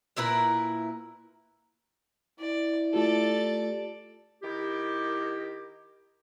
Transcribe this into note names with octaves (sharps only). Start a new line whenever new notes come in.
A#2 E4 A#4 B4
E4 D5
A3 F4 G4 A4 D5
D#3 E4 G4